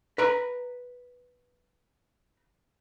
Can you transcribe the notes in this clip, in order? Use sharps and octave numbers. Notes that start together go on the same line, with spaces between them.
B4 A#5 B5